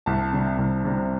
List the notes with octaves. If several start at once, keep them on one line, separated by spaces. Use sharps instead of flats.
C2 A5
C3 G3
C2
C3 G3